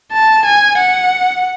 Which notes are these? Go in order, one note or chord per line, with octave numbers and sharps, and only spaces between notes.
A5
G#5
F#5